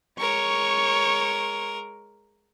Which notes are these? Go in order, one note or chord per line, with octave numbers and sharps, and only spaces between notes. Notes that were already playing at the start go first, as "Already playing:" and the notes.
G#3 A#4 C#5 C#6